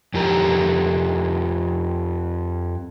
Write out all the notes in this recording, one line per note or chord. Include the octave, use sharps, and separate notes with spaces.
F2 G4 A#4